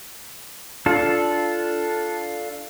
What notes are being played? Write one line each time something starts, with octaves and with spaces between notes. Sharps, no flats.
D4 F4 A4